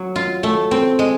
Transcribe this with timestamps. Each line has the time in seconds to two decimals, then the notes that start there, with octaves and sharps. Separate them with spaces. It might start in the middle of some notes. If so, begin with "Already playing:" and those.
Already playing: F#3
0.16 F4
0.43 A3
0.71 C4
0.99 G#3